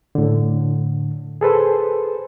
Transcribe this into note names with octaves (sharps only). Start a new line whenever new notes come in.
A2 D3
G#4 A4 B4 C5